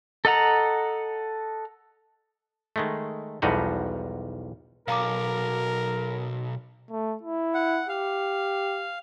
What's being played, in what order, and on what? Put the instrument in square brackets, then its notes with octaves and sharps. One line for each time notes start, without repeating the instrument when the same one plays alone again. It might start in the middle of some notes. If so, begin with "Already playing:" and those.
[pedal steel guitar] A4 D#5 F#5 A#5
[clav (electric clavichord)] D#3 G#3 A3
B1 E2 F3 G3 D#4 F#4
[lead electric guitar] B1 [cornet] A#4 [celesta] F5 A#5 D6
[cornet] A3
E4
[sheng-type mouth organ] F#5
[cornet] G4 [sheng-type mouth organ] F5